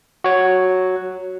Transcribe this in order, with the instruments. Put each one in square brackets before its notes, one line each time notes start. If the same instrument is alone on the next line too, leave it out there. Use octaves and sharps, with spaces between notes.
[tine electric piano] F#4 C#5